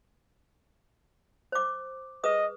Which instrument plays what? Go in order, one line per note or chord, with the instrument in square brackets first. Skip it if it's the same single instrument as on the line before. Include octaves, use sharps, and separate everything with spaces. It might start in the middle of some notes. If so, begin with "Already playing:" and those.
[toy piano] C5 D6
[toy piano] G#4 B4 D#6 [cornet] D#5